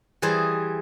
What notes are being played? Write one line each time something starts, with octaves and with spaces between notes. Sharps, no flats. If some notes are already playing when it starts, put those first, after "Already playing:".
E3 G3 G#4 C5 D#5